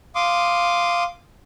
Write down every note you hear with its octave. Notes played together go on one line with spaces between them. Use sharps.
F5 C6 D6 D#6